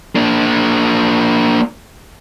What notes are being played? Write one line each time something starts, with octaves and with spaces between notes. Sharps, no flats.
A#3 D4